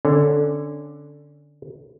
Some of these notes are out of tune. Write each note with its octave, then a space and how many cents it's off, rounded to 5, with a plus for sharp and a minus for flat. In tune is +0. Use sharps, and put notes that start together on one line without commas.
D3 +0 C#4 -15